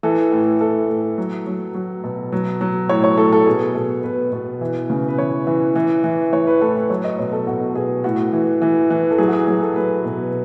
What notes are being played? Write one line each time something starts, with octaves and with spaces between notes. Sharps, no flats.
E3 A4
A2
A2 A4
A2
F#3
F#3
F#3
B2
F#3
F#3
A2 C#5
C#5
A2 A4
A4
B2 G#4
B2 A4
B2 B4
B2
E3
C#3
B4
E3 C#5
E3
E3
E3
E3 C#5
B4
A2 A4
B4
F#3 C#5
D#5
B2 C#5
A4
B2 F#4
B2 G#4
A2 F#4
E3
E3
E3
A4
F#3 G#4
F#4
G#4
F#3 G#4
A4
F#3 B4
B2